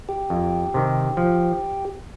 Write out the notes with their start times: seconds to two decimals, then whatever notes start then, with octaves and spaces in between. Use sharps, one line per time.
0.09 G4
0.30 F2
0.74 C3 D#3
1.17 F3